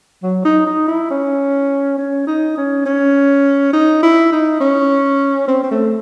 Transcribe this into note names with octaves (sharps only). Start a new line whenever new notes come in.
F#3
D#4
D#4
E4
C#4
C#4
D#4
C#4
C#4
D#4
E4
D#4
C#4
C4
C4
A3